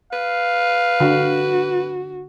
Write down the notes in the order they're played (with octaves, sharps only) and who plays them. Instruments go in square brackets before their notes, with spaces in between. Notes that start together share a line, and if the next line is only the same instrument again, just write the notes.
[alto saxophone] B4 [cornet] F5
[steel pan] D3 [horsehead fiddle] F#4